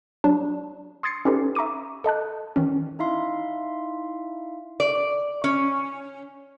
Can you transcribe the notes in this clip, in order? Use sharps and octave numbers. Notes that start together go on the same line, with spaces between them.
F#3 D4
C6 D#6 G#6 A6 C7 C#7
C#4 D#4 G4 A4 B4
E5 A#5 C#6 D6 D#7
A4 D#5 A5 F#6
D#3 E3 C#4
D#4 E4 E5 F5 C6
D5
C#4